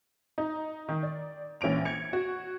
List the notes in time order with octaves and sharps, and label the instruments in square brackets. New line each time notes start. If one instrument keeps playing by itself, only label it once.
[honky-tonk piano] D#4
D#3
D5
A#1 E3 C#4 D7 F7
G#6 C#7 F7
F#4